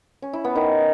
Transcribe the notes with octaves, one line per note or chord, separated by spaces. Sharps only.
C#4
E4
B3
D#3